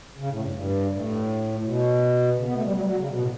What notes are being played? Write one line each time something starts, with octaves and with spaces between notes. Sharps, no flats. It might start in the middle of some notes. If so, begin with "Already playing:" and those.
C#3
A2
G2
G2
A2
A2
B2
C#3
B3
A3
G3
F#3
G3
F#3
C#3
B2
A2